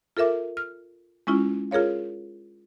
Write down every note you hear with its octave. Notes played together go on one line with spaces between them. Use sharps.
F4 A4 A#4 E5 D6
F6
G#3 C#4 E4 F4
F4 G#4 A#4 C#5 F5